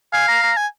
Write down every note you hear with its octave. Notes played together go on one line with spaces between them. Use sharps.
F5 G#5
A#5
A#5
G#5